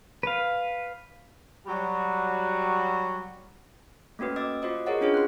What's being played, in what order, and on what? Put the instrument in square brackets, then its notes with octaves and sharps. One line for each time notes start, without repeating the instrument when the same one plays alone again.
[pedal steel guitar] B4 F5
[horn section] F#3 G3 F#4
[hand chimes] A3 A#3 C#4 F#4 B4
D#5 D6 E6 A6
F4 F#4 C5 D#5 D6
G#4 A#4 C#5 D#5 F#5
C#4 D4 F4 G#4 B4 C#5
C6 F#6